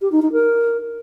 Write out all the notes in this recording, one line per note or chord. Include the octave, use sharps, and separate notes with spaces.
G4
D#4
D#4
A#4